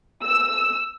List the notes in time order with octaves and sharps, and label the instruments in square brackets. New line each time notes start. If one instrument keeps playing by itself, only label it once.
[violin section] E6